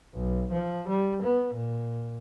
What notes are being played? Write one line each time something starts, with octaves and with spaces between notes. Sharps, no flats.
B1
F3
G3
B3
A#2